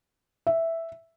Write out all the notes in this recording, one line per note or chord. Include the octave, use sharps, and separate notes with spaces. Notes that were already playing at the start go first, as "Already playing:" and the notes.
E5